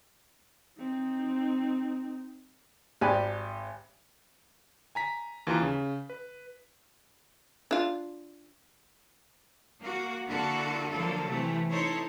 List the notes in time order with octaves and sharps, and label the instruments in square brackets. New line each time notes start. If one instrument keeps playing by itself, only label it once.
[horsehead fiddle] C4 D#4
[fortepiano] G#1 G4 D5 G#5 B5 F#6
[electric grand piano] G#5 A#5 B6
D#2 E3 F4 B4 A#5
C#3
B4
[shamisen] D4 F4
[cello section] A#3 F#4
D3 A#3 E4 F#4 A4
D3 F3 F#3 A#3 A4
C3 E3 A3
D#4 E4 A4 C5 C#5